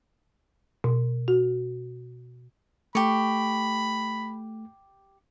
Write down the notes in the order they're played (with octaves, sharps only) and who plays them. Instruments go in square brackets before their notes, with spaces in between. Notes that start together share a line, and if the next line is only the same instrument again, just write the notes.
[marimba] B2
F#4
[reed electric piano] A3 [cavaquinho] G4 C#6 [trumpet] B5